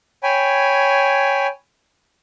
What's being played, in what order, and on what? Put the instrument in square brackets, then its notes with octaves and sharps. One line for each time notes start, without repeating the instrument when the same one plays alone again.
[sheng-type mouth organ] C#5 G5 G#5 B5